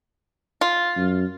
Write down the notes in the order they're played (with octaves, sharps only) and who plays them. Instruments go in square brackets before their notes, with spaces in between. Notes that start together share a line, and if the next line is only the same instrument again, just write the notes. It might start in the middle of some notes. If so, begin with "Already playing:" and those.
[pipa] F4
[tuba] F#2